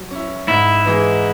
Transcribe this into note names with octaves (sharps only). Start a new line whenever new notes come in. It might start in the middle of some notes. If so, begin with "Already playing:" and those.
Already playing: F#3
C#4 E4
G#2 E4
E3 G#3 D#4 G#4